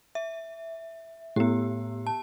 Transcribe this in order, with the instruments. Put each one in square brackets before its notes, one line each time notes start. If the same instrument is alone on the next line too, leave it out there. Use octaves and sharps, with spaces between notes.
[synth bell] E5
[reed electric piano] A2 [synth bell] B3 G4
[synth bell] A5